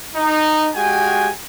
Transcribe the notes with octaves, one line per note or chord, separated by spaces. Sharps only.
D#4
G#3 F#4 G4 G5 G#5